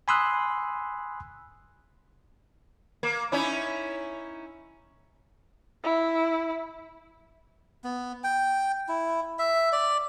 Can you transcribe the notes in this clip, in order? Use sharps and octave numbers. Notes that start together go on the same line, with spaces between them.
G#5 B5 C6 D#6 E6 F#6
A#3
C#4 D#4 E4
E4
B3
G5
E4
E5
D5